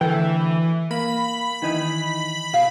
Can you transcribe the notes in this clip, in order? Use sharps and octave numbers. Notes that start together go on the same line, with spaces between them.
D2 E3 A4 G5
A#3 B5
D#3 E3 D#4
B2 F5